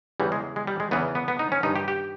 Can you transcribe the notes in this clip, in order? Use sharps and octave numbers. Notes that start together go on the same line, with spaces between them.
E2 C#3 E3 G3
G#3
G#3
G3
G#3
E2 C#3 E3 B3
B3
B3
D#4
C#4
G2 D#3 D#4
G4
G4